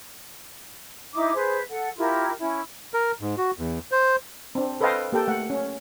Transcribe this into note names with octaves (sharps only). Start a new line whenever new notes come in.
D#4 E4 E5 D6
G#4 B4 C5
A4 F#5
E4 F4 G4 A#4
C#4 E4
A#4
G#2
F#4
E2
C5
C4 D4
A4 B4 C5 D#5 F5 G5
A#3 G4 A4 G5
A3 F#5
C#4